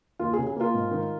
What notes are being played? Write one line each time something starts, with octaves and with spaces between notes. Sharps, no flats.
D#2 F4
C#3 G#4
G#4
A#3 F4 A#4
G#2
D#3